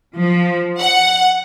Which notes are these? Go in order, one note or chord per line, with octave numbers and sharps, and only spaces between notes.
F3
F#5